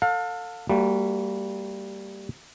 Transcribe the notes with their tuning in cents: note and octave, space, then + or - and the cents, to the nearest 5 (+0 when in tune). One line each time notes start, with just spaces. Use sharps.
A4 +30 F5 +35
G3 +0 A#3 -35 F#4 +0